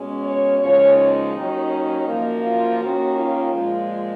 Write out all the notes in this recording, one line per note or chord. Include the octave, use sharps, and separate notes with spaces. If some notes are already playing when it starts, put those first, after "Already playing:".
Already playing: B2 G#3 C#4
C#5
D#2 C#3 F3 G#3 C#4 C#5
D#4
D#2 D#3 F#3 C#4
F#2 F3 A#3
F4
D#2 D#3 A#3 C#4 F#4
F4
A#2 F3 G#3